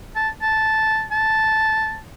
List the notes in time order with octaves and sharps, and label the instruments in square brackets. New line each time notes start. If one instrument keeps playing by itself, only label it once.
[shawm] A5
A5
A5